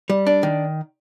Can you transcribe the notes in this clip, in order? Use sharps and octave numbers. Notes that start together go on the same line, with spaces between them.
G3
D4
D#3